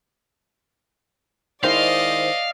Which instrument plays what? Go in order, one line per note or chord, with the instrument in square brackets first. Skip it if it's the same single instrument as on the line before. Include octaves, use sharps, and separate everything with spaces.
[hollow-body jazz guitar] D#3 G#3 E4 [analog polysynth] C5 [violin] D5 D#5 [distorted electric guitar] F5